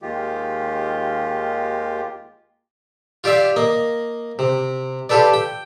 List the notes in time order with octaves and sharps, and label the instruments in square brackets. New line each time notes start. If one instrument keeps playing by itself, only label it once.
[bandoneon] D#2 D#3 G#3 F4 G4
[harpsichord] F4 G4 D5 E5 F5
A#3 D#5
C3
F4 G4 A4 B4 D5
G5